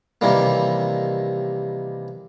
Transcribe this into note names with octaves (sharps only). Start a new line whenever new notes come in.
C3 D#3 E3 G3 A#3